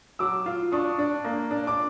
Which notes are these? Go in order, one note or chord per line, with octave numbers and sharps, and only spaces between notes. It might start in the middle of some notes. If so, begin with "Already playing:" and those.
F#3 D6 E6
F4
D4 C#6 D#6
D4
A#3
D4
D6